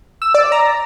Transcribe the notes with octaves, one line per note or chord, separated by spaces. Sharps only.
E6
D5
A#5